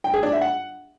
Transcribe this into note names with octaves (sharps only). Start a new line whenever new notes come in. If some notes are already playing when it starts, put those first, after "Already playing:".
G5
G#4
D4
E5
F#5